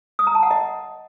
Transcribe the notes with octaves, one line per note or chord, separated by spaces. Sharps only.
D#6
A#5
A5
F#5
D#5